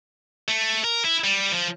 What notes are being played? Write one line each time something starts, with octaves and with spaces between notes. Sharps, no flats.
A3
A#4
E4
G3
F3